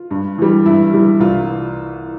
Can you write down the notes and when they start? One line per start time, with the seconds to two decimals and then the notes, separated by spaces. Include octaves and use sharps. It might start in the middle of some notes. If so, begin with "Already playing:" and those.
Already playing: F4
0.11 G2
0.38 E3 G3
0.66 G2 E4
0.93 E3 G3
1.20 C2 F4